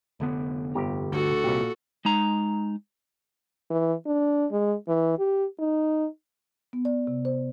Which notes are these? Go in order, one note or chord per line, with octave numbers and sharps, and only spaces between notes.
F1 D3 B3
G1 G4 A#5
D2 F#4 A4
C2 A#2 G4
G#3 D#4 A#5
E3
D4
G#3
E3
G4
D#4
B3
D5
C3
C5